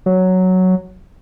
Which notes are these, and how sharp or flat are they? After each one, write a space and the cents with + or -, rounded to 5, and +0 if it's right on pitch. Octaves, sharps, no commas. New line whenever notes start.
F#3 +0